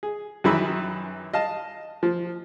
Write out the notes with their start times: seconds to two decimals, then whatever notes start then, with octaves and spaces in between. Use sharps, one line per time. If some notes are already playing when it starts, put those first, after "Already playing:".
0.03 G#4
0.44 F#2 D#3 E3 E5 B5 E6
1.33 D#5 F5 A5
2.03 F3